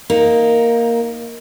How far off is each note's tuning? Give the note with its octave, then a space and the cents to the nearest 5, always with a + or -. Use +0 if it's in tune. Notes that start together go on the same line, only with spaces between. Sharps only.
A#3 +0 D#4 +15